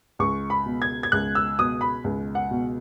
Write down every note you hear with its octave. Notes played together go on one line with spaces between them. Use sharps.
C#2 C#6
B5
B2
G#6
G#6
C#2 F#6
E6
B2 D#6
B5
C#2
F#5
B2